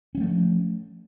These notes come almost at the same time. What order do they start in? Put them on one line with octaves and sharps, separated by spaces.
C#4 F#3 A3 F3